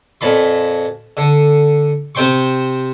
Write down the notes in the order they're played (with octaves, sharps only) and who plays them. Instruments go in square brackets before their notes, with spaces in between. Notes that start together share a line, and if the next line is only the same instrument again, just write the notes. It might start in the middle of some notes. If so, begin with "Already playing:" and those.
[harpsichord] F2 A#2 A5 B5 C6
D3
C3 C4 C5 G5 C6 C#6